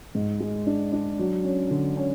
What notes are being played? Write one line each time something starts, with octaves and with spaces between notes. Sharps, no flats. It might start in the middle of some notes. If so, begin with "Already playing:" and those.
G#2
G#3
D4
D4
F#3
C#4
D3
C#4